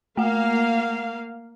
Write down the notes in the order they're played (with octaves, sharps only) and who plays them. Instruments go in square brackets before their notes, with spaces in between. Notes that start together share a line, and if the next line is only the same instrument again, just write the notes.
[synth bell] A3 F#5 [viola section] A#3 F5